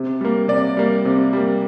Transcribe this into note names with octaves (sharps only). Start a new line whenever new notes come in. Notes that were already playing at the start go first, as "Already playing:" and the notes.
Already playing: C3
G3 A#3
C3 D5
G3 A#3
C3
G3 A#3